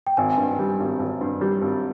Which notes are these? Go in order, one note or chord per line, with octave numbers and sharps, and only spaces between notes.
G5
G#1 G#5
G2
G3
G#1
G#1
G2
G3
G#1